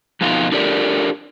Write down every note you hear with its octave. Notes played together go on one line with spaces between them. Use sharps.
F2 B2 B3 D#4 F4
D4 F4 G4 A4 A#4 D5